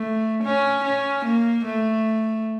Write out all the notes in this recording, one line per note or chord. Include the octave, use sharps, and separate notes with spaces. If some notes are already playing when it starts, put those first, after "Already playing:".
Already playing: A3
C#4
C#4
A#3
A3